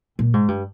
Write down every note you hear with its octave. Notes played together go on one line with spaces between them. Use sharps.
A#2
G#2
G2